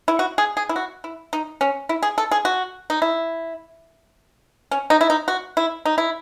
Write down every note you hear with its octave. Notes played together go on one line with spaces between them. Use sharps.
E4
F#4
G#4
G#4
E4
F#4
E4
D#4
C#4
E4
G#4
A4
G#4
F#4
D#4
E4
C#4
D#4
E4
D#4
F#4
E4
D#4
E4